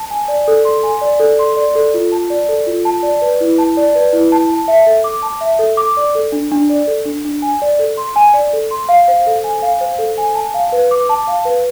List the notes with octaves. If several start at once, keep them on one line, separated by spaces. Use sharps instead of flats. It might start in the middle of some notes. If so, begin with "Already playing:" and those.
Already playing: A5
G#5
D5
A4
C6
G#5
D5
A4
C6
D5
A4
F4
A5
D5
A4
F4
A5
D5
B4
E4
A5
D5
B4
E4
A5
A5
E5
A4
D6
A5
E5
A4
D6
D5
A4
D4
D4
D5
A4
D4
D4
G#5
D5
A4
C6
G#5
D5
A4
C6
F5
C5
A4
G#5
F5
C5
A4
G#5
A5
F5
B4
D6
A5
F5
B4